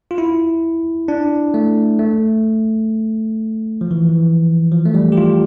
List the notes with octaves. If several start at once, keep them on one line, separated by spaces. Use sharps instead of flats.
F4
E4
D4
A3
A3
F3
E3
E3
F3
A3
G3
G4
F4